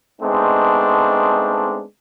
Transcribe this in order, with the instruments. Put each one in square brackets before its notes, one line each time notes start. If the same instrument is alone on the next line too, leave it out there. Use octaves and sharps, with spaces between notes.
[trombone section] G#3 A3 B3 C4 D4 D#4